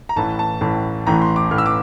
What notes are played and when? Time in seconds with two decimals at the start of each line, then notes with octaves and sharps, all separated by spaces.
0.09 A#5
0.16 A1 A2 E3 A5
0.39 A5
0.61 A1 A2 E3 A5
1.06 A1 A2 E3 A#5
1.22 C6
1.36 D6
1.51 A1 A2 E3 F6
1.58 E6
1.66 D6